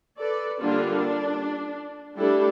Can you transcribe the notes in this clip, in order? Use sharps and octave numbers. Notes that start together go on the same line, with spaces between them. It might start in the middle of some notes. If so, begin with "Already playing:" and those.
A4 B4 D5
D3 G3 A#3 D4 F4 A4
D4
G3 A3 D4 E4 G4 A4